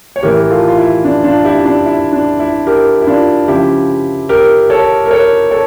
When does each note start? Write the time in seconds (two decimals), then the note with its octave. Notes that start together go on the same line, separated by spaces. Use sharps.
0.16 C#5
0.23 A2 E3 G4 A#4
0.40 A#4
0.50 F4 A4
0.68 F4
0.78 E4
1.05 D4
1.24 D4 F4
1.45 E4 G4
1.65 D4
1.85 E4
2.13 D4
2.40 E4
2.67 G4 A#4
3.01 E4
3.07 D4 F4
3.48 C#3 F3 E4 G4
4.29 G4 A#4
4.70 A4 C#5
5.06 A#4
5.11 A4 C#5
5.51 A4 C#5